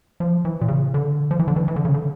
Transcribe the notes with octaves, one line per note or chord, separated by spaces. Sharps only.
F3
E3
A#2
C#3
D3
F3
E3
D3
E3
E3
D3
C#3
D3